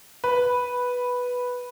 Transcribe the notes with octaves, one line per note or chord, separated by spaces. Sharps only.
B4